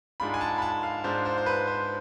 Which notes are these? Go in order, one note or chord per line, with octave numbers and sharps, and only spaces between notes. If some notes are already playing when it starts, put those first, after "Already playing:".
G#2 G#3 D4 F4 B5
G#5
A5
B5
A5
F5
G#2 G#3 D4 F4 C5
C5
C5
B4
C5